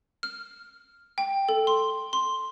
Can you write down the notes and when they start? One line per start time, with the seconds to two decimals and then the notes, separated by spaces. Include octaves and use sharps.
0.23 F6
1.18 G5
1.49 A4
1.67 C6
2.13 C6